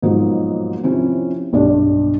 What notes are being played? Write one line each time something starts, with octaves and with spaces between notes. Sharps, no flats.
G#2 B2 F3 F#3 A#3 D#4
C3 F3 C#4 E4
B1 G2 D4 D5